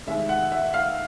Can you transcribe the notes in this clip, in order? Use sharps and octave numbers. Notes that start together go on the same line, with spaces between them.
C3 D#3 G#3 E5
F#5
E5
F5